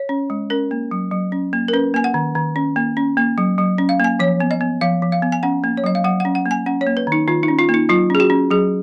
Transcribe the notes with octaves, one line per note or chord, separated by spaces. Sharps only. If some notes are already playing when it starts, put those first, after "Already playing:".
Already playing: C#5
C#4
G#3
C#4 A#4
A#3
F#3
F#3
C#4
A#3
A#4
C#4 B4
A#3 G#5
F#5
D#3
D#3
C#4
A#3
C#4
A#3
F#3
F#3
C#4
F5
A#3 G#5
F3 C#5
B3
D#5
B3
F3 F5
F3
F5
B3
G#5
C#4 F#5
A#3
C#5
F#3 D#5
F5
F#3 F#5
F#5
C#4
F#5
A#3
G#5
C#4 F#5
C#5
A#3
B4
D#3 D#4
D#3 F4
D#4
C#4
F4
A#3
D#4
F#3 F4
C#4 G#4
F#4
C#4
F#3 G#4